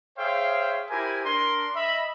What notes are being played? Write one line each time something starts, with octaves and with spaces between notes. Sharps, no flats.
G#4 C5 C#5 E5 F5 G5
E4 G4 A#4 C5 G#5
D4 A#4 C6
D#5 E5 B5